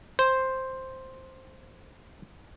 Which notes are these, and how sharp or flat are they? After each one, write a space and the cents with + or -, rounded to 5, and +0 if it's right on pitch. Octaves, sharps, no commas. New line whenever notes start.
C5 +5